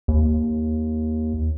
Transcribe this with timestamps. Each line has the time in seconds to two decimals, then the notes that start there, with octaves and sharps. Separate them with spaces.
0.08 D#2